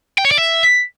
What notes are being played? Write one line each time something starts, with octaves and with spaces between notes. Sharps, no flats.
G5
C#5
D5
E5